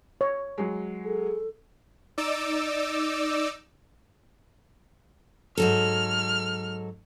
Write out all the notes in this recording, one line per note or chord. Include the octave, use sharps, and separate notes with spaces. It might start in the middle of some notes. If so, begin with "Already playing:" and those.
C#5
F#3 G#3
G#4 A4
D#4 D5 D6 E6
G#2 F#3 A4 F6